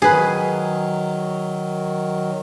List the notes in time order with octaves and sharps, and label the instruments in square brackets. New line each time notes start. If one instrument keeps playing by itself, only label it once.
[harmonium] D#3 F#3 [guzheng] G#4 B4